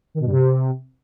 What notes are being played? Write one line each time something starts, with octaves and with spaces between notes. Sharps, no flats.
D#3
B2
G2
C3